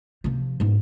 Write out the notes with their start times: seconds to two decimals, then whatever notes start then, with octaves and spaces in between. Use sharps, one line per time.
0.24 C3 F3
0.60 G#2 B2